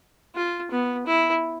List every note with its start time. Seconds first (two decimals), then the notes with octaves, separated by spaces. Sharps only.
0.35 F4
0.71 B3
1.06 E4